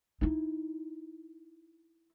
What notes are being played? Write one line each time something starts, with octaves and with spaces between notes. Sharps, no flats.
D#4 E4